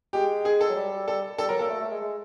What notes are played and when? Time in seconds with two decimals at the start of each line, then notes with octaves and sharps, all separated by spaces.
0.13 G#3 G4
0.45 G#4
0.61 A4
0.69 F#3
0.76 G3
1.07 G3 A4
1.38 G3 A4
1.49 F#3 A#4
1.59 A#3 A4
1.69 A3
1.80 A3
1.91 G#3
2.01 G#3